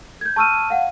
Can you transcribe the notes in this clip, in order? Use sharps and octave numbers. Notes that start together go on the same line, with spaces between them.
G6 G#6
A5 C#6 E6 F6 D#7
F5 F#5